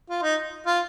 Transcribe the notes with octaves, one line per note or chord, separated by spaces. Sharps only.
F4
D#4
F4